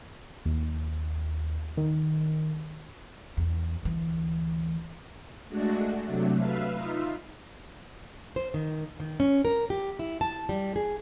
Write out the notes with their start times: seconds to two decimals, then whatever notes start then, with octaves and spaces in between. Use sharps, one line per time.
0.45 D#2
1.77 D#3
3.37 E2
3.83 D2 E3
5.48 G#3 A3 D4 F#4
6.05 C3 F#3 A3 D4
6.36 B4 E5 F5
6.72 D#4 F4 E5
8.36 C5
8.54 D#3
9.00 D#3
9.20 C#4
9.45 A#4
9.70 G4
9.99 E4
10.21 A5
10.49 G3
10.76 G#4